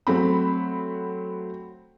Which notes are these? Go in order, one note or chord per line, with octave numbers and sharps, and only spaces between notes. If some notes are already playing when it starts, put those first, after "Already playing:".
F#3 A3 C4 B5